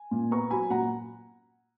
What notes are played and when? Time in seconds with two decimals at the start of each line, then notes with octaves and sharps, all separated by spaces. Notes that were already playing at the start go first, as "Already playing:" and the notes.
Already playing: G#5
0.11 A#2
0.31 B3 A#5 C#6
0.51 F#3 G#5 B5
0.70 A#2 F#5 A#5